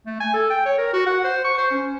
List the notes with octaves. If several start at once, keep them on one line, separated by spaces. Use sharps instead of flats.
A3
G#5
A4
G5
C#5
A#4
F#4
F#5
C5
C#6
C5
C#4